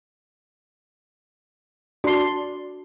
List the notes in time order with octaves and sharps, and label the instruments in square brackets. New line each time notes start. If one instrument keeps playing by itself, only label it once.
[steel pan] D4 C6 [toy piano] F#4